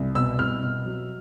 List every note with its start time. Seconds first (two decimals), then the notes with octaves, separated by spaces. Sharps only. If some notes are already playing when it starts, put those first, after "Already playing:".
Already playing: C2
0.15 B2 E6
0.39 C2 F6
0.63 B2
0.86 F#3